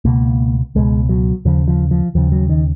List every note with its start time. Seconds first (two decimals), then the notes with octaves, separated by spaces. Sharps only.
0.05 C#2 B2 A#3
0.75 C#2 B2 G#3
1.09 F#3
1.45 D#2 C#3 F3
1.68 F3
1.91 F3
2.15 D#2 C#3 F3
2.32 F#3
2.50 D#3